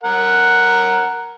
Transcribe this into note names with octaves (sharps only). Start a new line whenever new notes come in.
A#4 F#5